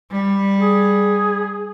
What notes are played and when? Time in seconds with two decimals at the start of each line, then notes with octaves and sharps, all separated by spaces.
0.12 G3
0.59 G#4